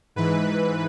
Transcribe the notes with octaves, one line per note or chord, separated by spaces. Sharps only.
G#2 E3 B4